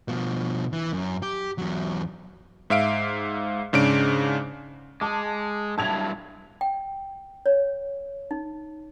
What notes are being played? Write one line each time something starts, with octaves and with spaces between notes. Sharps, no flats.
B2 F3
E3
F#2
G4
E2 F#3
G#2 E5 F5 D7
G#2 C#3 D4 D7
G#3 A5 D6
G2 F#3 E4 A5 G#6 F7
G5
C#5
D#4